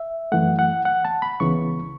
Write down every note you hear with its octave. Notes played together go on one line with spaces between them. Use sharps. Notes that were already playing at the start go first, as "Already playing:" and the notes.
Already playing: E5
F#2 E3 A3 F#5
F#5
F#5
A5
B5
C#2 C#3 E3 B3 C#6